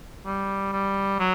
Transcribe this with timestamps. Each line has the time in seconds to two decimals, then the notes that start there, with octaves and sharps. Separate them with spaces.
0.26 G3
0.73 G3
1.19 F#3